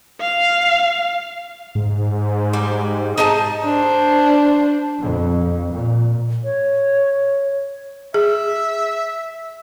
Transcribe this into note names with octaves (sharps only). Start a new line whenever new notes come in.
F5
G#2
G3
D#4 G#4 A5
D4 C5
F2
A#2
C#5
G#4 E5